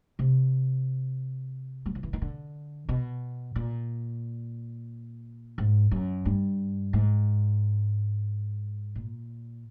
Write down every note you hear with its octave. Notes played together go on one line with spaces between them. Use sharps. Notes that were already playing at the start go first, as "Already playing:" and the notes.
C3
F#3
F3
E3
D#3
D3
B2
A#2
G#2
F#2
G2
G#2
A#2